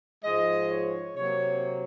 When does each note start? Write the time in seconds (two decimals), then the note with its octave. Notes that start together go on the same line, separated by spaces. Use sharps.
0.23 G#2 F3 G#3 D#5
0.70 C#5
1.16 C3 F#3 A#3 C#5